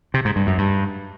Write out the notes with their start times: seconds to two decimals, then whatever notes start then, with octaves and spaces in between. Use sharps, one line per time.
0.14 C3
0.25 G#2
0.36 G2
0.47 F#2
0.58 G2